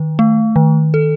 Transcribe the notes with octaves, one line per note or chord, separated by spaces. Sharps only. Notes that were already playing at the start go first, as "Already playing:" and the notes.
Already playing: D#3
A3
D#3
A4